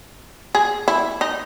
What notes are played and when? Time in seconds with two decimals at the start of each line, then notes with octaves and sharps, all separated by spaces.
0.55 G#4
0.88 E4
1.21 D#4